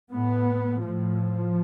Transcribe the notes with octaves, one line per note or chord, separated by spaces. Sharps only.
A2 B3
A2 F3